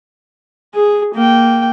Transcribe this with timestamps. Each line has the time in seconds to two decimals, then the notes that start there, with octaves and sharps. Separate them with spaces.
0.74 G#4
1.15 A#3 G5